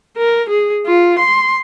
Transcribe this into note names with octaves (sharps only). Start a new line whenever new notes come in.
A#4
G#4
F4
C6